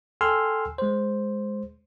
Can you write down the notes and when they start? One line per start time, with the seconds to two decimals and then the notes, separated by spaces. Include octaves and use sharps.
0.21 A4 G5 G#5 C6 E6 F6
0.78 G#3 C5